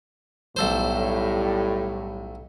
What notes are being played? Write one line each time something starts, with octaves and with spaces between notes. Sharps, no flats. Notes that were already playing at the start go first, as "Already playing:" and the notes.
B1 A2 G3 A4 C5